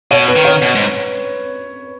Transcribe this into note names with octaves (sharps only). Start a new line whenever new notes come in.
B2 C#5
B4
D#3
C#5
B2
G#2